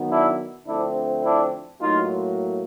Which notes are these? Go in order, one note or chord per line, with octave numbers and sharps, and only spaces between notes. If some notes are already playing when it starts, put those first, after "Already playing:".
Already playing: D#3 F#3 B3
D4 E4
D3 F3 A3 C4 D4 E4
D4 E4
A2 F#3 A#3 D#4 F4